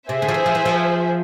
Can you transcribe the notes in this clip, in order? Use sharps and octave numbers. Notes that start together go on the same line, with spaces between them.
C3 G#4 C5 E5
D3
F3
E3
F3
E3
F3